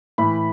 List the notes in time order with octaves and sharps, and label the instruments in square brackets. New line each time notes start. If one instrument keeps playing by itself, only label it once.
[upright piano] A2 E3 B5